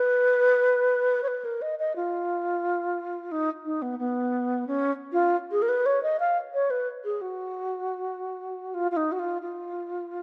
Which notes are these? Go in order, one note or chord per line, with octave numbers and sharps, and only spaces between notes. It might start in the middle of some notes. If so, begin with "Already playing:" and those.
Already playing: B4
C#5
B4
A#4
D#5
D#5
F4
D#4
D#4
B3
B3
C#4
F4
G#4
A#4
B4
C#5
D#5
F5
C#5
B4
G#4
F#4
F4
F4
D#4
F#4
F4
F4